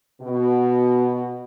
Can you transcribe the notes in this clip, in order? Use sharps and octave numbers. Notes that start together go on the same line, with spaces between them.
B2